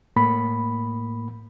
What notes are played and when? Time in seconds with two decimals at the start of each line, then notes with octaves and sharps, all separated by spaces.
0.16 A2 A#3 B5